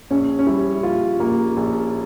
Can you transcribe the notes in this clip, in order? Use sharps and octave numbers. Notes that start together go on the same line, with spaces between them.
A#1 C#4
C#4
G3 E4
A#1 F4
A#1 A#3
A#1